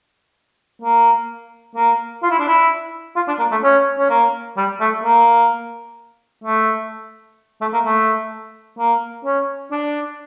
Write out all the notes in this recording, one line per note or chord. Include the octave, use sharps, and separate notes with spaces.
A#3
A#3
F4
E4
D4
E4
F4
D4
A#3
A3
C#4
C#4
A#3
G3
A3
A#3
A3
A3
A#3
A3
A#3
C#4
D4